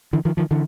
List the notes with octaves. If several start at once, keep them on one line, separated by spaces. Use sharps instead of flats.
D3 E3
D#3 F3
D#3 F3
D3 E3